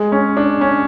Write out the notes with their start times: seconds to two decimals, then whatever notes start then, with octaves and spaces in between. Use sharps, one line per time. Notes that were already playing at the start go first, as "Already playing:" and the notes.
Already playing: G#3
0.12 C#4
0.37 D4
0.61 C#4